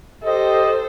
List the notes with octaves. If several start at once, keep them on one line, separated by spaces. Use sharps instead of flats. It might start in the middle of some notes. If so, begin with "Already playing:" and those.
G4 A4 C5 D#5